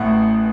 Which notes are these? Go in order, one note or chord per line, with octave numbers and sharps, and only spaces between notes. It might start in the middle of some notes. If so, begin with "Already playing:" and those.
Already playing: A1 A2 F#5